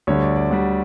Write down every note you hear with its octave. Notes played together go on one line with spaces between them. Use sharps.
D2 D3 G3 C#5
D5
D5
D2 D3 G3 F#5